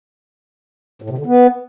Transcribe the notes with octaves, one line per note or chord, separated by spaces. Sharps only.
A2
C3
D3
B3